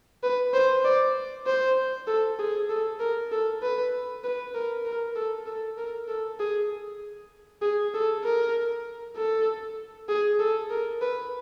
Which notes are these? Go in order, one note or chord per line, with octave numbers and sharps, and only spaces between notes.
B4
C5
D5
C5
A4
G#4
A4
A#4
A4
B4
B4
A#4
A#4
A4
A4
A#4
A4
G#4
G#4
A4
A#4
A4
G#4
A4
A#4
B4